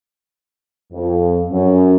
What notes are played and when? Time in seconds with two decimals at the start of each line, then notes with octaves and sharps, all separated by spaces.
0.92 F2
1.50 F#2